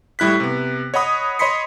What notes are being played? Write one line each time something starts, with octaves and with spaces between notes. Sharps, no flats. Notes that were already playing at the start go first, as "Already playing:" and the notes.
A2 G3 E4 F#6 B6
C3 B3
C#5 D#5 F#5 B5 D#6
C#5 D#5 B5 C6 B6 C#7